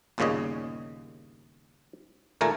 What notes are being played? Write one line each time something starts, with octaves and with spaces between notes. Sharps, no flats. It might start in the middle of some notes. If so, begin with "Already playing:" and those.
G1 D#2 A#2 C#3 C#5 D#5
D#2 A#2 A3 A#4 G#5 A#5